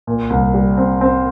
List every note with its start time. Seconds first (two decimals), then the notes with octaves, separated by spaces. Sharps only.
0.07 A#2
0.30 C2
0.54 G3
0.77 C4
1.01 C4